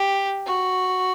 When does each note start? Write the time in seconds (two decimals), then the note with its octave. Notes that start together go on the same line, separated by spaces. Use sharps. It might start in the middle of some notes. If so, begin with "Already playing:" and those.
Already playing: G4
0.46 F#4